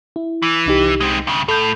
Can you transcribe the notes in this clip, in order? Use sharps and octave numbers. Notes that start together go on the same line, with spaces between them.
E4
E3
C2 D#4 G4
G#3 C4
G2 C#3
A2 A4 G6